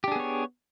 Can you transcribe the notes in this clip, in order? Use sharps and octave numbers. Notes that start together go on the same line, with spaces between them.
B3 D4 G4 G#4 C#5